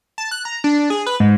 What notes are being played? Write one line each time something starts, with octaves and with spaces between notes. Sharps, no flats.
A5
F#6
A#5
D4
D4
G#4
B4
G#2